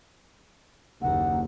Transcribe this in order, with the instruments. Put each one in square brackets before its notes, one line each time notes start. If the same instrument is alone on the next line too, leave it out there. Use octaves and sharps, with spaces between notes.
[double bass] F#1 D#2 [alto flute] F#5